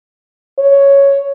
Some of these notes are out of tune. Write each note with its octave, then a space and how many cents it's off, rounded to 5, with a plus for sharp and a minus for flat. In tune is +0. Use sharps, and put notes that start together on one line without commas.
C#5 +5